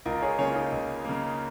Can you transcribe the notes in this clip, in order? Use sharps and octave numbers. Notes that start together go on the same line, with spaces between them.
C#2 F4 A#4
G#4 C#5
C#3 A#3 G#4 C#5
F4
D#4 G#4
C#2
C#3 A#3